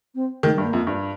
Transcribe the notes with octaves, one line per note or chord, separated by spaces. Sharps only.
C4
D#3 A3
G3
G2
A#3
F2
G2